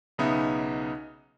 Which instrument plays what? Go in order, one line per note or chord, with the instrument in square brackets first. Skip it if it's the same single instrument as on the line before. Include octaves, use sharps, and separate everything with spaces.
[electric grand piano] B1 C#3 B3 D#4 E5